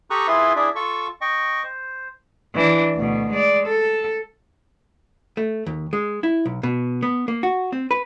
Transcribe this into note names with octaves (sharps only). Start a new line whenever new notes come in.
G4 A4 A#5 C#6 D#6 F#6
E4 F4 G#4 B4 E5 C6
D4 E4 G#4 D5 E5
F4 A4 A5 C#6
D#5 G5 C#6
C5
E3 D4
D2 B2
G#3 D5
A4
A3
D#2
G#3
E4
B1
B2
B3
A#3
F#4
C4
B4